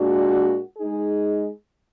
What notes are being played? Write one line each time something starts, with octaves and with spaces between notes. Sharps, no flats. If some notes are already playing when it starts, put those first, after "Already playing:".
Already playing: A#2 G#3 D4 F#4
G#3 D#4 G#4